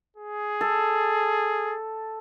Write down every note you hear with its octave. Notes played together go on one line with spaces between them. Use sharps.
G#4
A4